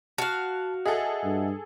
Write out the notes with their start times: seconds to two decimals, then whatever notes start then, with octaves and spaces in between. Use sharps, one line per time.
0.18 F#4 F5 A5
0.86 G#4 A4 D#5 E5 F#5
1.24 G2